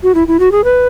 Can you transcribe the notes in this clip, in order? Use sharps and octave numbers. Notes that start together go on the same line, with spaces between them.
F#4
E4
E4
F#4
G#4
B4